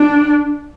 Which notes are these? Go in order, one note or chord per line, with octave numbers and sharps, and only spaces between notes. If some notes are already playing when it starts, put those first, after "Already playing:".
Already playing: D4